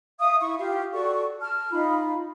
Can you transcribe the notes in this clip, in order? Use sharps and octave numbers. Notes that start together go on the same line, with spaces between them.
E5 F5 D#6
E4 C#6
F4 G4 F5
F#4 A4 D5 C#6
A5 F6
D#4 F4 B5